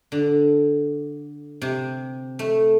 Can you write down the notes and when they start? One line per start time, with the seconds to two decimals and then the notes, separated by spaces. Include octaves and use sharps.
0.12 D3
1.62 C3
2.39 A3